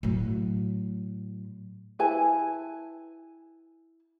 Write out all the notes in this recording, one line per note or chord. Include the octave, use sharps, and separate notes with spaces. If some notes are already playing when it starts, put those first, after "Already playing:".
A2 F#3
E4 B4 G#5 A5